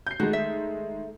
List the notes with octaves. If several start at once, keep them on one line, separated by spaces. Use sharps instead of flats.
G6 C7
D#3 G#3 A3 F#4
E5